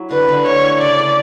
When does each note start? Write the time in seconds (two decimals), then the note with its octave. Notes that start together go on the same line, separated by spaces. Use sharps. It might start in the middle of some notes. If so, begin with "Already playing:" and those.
Already playing: F#3 E4
0.11 D3 B4
0.28 D3
0.46 A3 C#5
0.63 E4
0.81 C#3 D5
0.99 C#3